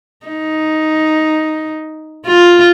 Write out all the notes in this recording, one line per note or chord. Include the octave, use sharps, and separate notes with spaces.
D#4
F4